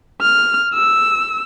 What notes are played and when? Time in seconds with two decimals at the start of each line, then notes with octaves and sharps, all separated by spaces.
0.21 F6
0.74 E6